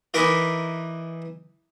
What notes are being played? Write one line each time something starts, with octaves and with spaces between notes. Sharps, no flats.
E3 D#4 A#4 B5 C#6 D6